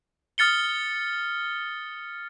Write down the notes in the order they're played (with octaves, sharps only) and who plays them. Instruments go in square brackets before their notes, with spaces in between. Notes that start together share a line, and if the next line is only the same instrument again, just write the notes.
[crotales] D#6 F6 A6 C#7 G7